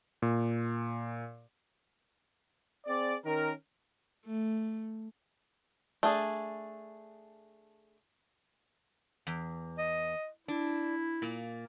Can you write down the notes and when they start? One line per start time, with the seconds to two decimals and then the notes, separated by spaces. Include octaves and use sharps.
0.22 A#2
2.86 C4 G#4 D5
3.25 D#3 C#4 A#4
4.26 A3
6.03 A3 D4 G#4
9.27 E2
9.79 D#5
10.48 D4 E4
11.22 A#2 A#3